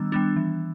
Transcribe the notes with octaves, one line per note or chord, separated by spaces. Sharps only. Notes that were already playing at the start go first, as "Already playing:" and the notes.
Already playing: D#3 G3 B3 D4 E6
G3 B3 D4
E3